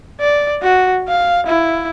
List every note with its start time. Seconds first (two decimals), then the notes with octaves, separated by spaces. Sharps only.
0.21 D5
0.63 F#4
1.08 F5
1.47 E4